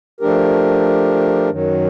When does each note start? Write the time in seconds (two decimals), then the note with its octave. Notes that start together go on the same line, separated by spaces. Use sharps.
0.20 F3 A3 D4 G4 A#4
1.50 F#2 D#3 F#3